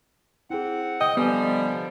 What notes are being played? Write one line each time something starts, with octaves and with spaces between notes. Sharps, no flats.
C4 E4 G#4 F#5
D#5 G5
D3 F3 G3 B3 D#5 G#5